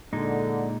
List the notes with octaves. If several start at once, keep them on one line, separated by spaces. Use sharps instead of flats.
A#2 D3 G#3 D#4